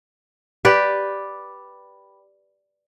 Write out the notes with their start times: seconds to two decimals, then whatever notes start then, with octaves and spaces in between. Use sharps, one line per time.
0.65 G4 B4 D5